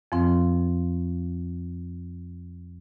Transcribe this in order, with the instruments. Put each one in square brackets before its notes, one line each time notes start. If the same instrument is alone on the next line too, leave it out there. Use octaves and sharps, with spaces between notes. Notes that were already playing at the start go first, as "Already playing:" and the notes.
[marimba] F2 F3 C4